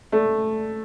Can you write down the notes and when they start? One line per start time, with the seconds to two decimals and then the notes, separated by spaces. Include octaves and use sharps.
0.12 A3